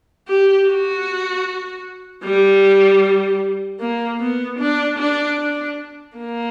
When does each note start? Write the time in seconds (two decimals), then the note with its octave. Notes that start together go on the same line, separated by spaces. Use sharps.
0.28 G4
0.67 F#4
2.24 G3
3.81 A#3
4.20 B3
4.59 D4
4.98 D4
5.38 D4
6.17 A#3